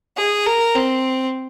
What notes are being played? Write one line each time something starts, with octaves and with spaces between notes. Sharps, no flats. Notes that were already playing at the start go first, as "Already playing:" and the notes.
G#4
A#4
C4